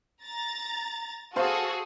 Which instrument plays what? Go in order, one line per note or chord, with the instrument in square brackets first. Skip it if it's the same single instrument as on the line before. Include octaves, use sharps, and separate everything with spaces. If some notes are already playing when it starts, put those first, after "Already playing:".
[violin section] A#5 A6
[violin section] F#4 G#4 A4 [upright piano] C5 F5 A5